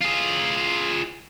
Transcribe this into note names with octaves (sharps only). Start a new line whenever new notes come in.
F4 G#4